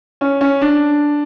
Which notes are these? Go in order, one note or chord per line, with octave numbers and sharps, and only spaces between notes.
C#4
C#4
D4